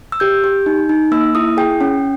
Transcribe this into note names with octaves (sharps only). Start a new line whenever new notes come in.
E6
G4 G6
G4
D#4
D#4
A#3 E6
E4 D#6
G#4 G5
C#4